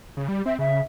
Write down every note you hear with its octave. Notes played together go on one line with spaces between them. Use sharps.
C#3
G3
C4 E5
C#3 E5